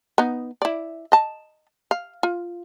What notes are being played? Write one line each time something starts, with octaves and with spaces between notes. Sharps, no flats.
B3 D#4
E4 D5
D#5 A5
F5
F4